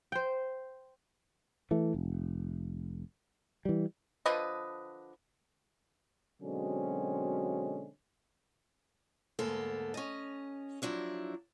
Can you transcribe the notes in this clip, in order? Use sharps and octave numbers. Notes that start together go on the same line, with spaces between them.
C5 G5
E3 A3
F1
E3 G3
D3 F3 B4 D#5
B2 D3 F#3 G#3 C4 C#4
D2 G#2 A#3 B3 A4
C#4 D#5
F3 F#3 D4 E4